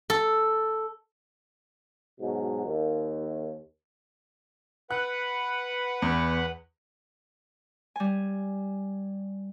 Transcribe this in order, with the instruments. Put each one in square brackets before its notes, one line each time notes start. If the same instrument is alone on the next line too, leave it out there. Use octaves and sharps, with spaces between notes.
[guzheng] A4
[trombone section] G#2 B2 F#3
D#2
[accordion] B4 F#5 B5 [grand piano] F#6
[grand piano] E2
[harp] G3 G#5